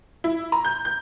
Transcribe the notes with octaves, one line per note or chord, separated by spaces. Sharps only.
E4
A#5
G6
G6